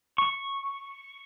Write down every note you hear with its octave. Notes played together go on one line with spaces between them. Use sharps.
C#6